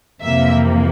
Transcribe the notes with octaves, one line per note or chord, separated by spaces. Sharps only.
F2 C3 E3 A#3 E5